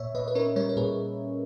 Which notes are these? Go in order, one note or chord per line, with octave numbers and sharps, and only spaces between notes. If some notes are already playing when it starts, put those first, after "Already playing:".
Already playing: A#2 C#5 E5
A#2 B4 D#5
B4
C#4 A#4 C#5
G3 A#4 C#5
A#4
A#2 G#4 B4